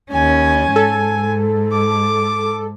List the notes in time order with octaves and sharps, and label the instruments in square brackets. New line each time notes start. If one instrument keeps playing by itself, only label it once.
[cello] D#2 C#4 [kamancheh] G#5
[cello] G#2 [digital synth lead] A4
[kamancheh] D6